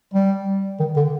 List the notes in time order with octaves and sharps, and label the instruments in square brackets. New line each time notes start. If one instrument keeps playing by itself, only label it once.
[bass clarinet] G3
D#3
D3